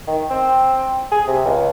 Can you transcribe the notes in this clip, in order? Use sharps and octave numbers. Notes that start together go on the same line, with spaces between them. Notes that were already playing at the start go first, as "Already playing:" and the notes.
D#3
C4
G#4
C3
C#2